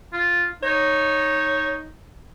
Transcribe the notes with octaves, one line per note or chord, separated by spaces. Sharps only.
F4
D#4 C#5